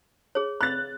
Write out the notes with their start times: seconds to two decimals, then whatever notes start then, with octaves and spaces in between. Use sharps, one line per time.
0.35 G#4 C#5
0.61 B5 F#6 A6